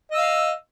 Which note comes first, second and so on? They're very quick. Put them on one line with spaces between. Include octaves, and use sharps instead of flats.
D#5 E6 F5